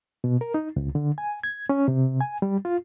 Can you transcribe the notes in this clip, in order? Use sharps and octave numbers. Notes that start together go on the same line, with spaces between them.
B2
A#4
D#4
C#2
D3
G#5
G#6
C#4
C3
G#5
G3
F4